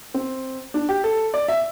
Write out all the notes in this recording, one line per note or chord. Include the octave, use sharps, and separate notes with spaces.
C4
D4
G4
A4
D5
E5